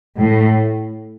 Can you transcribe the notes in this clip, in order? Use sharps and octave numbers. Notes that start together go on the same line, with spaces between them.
A2